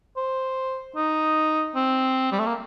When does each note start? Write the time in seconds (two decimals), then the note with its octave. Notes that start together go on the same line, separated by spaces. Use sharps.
0.17 C5
0.96 D#4
1.76 C4
2.32 G3
2.39 A3
2.46 A#3